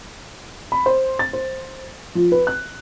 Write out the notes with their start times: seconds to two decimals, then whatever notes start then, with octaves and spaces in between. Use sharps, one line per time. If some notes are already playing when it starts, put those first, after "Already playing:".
0.72 B5
0.86 C5
1.19 A6
1.33 C5
2.15 F3
2.32 B4
2.47 F#6